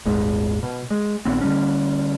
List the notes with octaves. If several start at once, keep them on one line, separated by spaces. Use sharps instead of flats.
D#1 G#1 G#3
B2
G#3
A#1 D#3 B3 C4
D3 G3 C#4